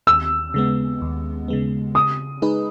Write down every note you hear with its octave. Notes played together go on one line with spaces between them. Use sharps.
D#2 E6
C#3 G#3 B3
D#2
C#3 G#3 B3
C#3 D#6
G#3 D#4 G#4 B4